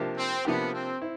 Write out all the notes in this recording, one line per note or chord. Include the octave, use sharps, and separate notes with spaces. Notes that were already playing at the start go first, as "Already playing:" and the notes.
Already playing: C3 F3 A#3 D4 G4
C4
C3 F3 A#3 B3 D4 G4
C4
C4 E4